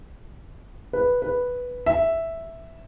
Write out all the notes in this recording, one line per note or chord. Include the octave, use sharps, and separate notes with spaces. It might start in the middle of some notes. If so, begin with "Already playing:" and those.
B4
B4
E5